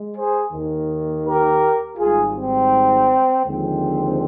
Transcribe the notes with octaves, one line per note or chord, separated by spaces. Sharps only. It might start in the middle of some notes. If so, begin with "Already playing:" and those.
Already playing: G#3
G#4 C5
D#2 D#3 A#3
G4 A#4
G#1 G#2 G3 F4 G#4
C4
D#2 D3 F3 G#3 C4